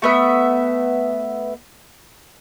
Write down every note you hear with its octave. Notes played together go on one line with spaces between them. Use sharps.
A3 B3 E5